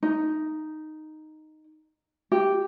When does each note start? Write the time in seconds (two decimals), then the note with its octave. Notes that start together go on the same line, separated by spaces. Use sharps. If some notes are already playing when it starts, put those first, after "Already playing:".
0.03 D#4
2.32 G4